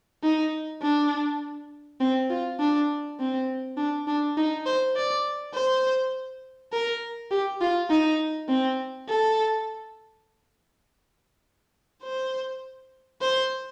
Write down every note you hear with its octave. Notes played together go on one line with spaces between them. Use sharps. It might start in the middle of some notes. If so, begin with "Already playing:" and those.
D#4
D4
C4
F4
D4
C4
D4
D4
D#4
C5
D5
C5
A#4
G4
F4
D#4
C4
A4
C5
C5